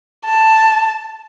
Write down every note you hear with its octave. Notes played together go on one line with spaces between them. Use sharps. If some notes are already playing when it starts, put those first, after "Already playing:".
A5